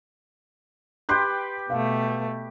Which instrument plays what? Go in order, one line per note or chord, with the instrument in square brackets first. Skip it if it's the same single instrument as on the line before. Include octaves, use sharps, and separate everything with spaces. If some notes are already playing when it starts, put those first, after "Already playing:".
[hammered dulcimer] G4 B4 G5 [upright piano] C6 F#6 G6
[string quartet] B2 A3 [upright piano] F5